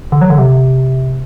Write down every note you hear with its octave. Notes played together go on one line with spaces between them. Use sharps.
D3
F#3
D3
C3